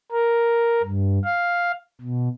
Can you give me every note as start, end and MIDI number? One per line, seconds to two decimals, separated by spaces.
0.12 0.82 70
0.83 1.19 43
1.25 1.72 77
2.01 2.28 47